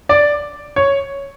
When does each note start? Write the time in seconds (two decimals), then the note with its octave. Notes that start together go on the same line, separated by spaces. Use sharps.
0.09 D5
0.76 C#5